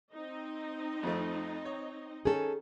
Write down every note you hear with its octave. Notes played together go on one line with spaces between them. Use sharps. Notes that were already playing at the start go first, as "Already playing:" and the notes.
C4 D#4 D#5
F2 F3 A3
C#5
D#3 C#4 G#4 A4